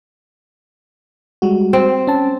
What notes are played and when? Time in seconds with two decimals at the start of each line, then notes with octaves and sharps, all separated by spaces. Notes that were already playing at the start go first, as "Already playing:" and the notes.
1.42 G3 G#3 F#4
1.73 C4
2.07 C#4 A5